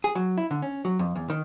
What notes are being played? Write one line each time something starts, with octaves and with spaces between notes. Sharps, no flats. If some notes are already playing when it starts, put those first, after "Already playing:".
G#4
F#3
E4
D3
C#4
F#3
F2
E2
D#3